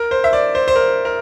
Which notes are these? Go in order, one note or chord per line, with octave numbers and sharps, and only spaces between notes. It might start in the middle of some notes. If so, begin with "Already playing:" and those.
Already playing: A#4
C5
E5
D5
C5
C5
A#4
A#4